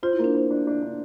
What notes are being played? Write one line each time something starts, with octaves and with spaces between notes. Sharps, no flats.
F4 C5
E4
A#3
D4
C5
D4
D4
D4